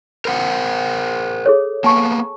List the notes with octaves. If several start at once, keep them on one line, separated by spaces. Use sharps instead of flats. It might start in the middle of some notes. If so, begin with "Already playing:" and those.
A#4 C5 F#5
G#4 A4 C#5
A#3 B3 G#5 A5 C#6